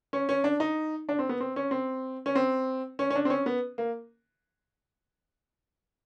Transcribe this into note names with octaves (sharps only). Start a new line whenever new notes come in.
C#4
C#4
D4
D#4
D4
C4
B3
C4
C#4
C4
C#4
C4
C#4
C#4
D4
C4
C#4
B3
A#3